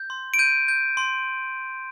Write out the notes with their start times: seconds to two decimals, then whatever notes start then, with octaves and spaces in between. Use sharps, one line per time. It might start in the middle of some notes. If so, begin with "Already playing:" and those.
Already playing: G6
0.10 C6
0.34 D7
0.39 G6 D#7
0.68 G6
0.97 C6